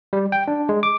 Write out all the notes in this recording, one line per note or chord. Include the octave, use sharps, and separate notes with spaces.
G3
G5
D4
G#3
D6